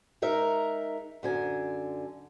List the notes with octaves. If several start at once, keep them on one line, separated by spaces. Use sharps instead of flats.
G#3 D#4 A#4 E5
F#2 D3 G#5